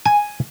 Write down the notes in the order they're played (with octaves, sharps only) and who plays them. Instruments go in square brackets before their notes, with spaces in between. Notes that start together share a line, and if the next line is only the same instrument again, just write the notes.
[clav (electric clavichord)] G#5